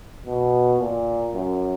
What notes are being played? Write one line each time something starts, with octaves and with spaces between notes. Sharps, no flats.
B2
A#2
F#2